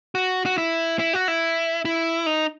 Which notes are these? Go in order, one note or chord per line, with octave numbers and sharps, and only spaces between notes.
F#4
F#4
E4
E4
F#4
E4
E4
D#4